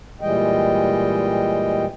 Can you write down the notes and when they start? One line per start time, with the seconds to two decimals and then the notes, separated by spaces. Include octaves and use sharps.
0.21 A#2 E3 G3 G#3 D#5 G5